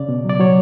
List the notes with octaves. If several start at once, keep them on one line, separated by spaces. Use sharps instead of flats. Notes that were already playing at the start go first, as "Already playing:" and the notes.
Already playing: C#3 D5
B2
F#3
D5
F#3 C#5